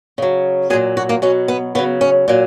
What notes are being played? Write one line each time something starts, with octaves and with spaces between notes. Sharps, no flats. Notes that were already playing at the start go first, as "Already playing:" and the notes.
C#3 F#3
A#2 F#3 G#4
F#4
A#3
B2 F#3 C#4
B3
C#3 F#3 B3
C#4
A#2 F#3